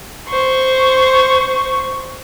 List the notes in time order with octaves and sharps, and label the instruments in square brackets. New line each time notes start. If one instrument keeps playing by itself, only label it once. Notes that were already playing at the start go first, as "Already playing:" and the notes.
[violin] C5 C#6